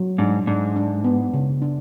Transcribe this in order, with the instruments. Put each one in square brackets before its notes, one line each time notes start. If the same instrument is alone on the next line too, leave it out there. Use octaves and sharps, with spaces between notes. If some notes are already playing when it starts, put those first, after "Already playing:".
Already playing: [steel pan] F#3
[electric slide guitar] G#2 [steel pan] D4
[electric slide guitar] G#2 [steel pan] D4
[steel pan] D4
B3
C#3
D4